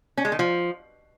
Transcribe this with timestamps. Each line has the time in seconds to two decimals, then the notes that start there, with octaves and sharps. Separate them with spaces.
0.17 C#4
0.25 G#3
0.32 D#3
0.39 F3